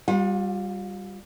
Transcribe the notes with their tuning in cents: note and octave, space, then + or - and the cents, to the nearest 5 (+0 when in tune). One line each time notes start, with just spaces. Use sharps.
G3 +0 F4 +35 F#5 -35